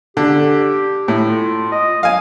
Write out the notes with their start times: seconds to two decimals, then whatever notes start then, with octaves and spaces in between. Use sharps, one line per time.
0.17 D3 G4
1.08 A2
1.28 F4
1.72 D#5
2.03 F#3 F5 G#5